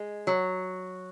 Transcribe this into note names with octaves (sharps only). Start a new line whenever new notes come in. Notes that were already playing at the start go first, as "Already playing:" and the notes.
Already playing: G#3
F#3